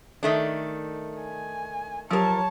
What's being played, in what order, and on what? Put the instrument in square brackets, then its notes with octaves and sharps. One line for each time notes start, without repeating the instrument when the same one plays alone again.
[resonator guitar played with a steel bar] D#3 A3 D4
[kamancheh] G#5
[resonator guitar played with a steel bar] F3 A#4 [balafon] F#3 G4 [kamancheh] C#5 A5